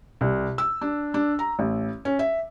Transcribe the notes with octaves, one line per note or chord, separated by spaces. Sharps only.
C2
E6
D4
D4
A#5
A1
C#4
E5